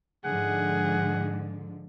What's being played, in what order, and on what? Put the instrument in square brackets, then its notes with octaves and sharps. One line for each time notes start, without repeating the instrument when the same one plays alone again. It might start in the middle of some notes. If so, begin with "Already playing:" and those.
[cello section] G#2 D3 F3 [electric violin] G#4 [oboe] F#5